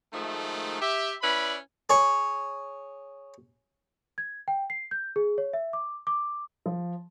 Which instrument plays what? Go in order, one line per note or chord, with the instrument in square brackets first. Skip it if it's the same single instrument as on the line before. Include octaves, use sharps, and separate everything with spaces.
[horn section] D#3 F3 G#3 A3
G4 E5
C#4 E4 B4 D5 B5
[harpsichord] G#4 C#5
[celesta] G#6
G5
C7
G6
G#4
C#5
E5
D6
D6
[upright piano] F3